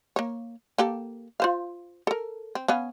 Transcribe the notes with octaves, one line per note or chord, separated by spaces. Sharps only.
A#3 C#5
A#3 G4 A4
F4 C5 F5
A4 A#4
C4
B3 C#4 F5